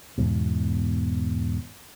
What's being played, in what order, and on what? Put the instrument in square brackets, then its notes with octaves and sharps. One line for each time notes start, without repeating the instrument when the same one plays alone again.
[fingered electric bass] E2 G#2 B2